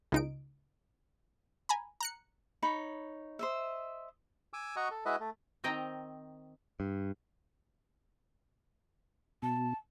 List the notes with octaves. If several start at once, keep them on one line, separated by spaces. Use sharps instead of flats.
C#2 D#4 D7
G#5 A#5 B5
A#5 F#6 C#7
D#4 C#5 B5
C5 D#5 E5
G#5 D6 E6
F#4 D#5 A#5 C#6
A4
G#3 E4 F#4 B4 D#5 E5
A3
D#3 C4 D#5 G5 A#5
G2
B2 A5